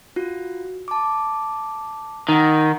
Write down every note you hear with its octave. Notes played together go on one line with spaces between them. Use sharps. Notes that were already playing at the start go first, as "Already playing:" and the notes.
F4 F#4
A5 D6
D#3 D#4 F#5